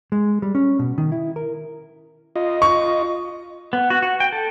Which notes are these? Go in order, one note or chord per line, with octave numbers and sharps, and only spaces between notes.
G#3
G3
C#4
B2
D#3
E4
A#4
F4 D#5
C#6
B3
F#4
F#4
G5
A4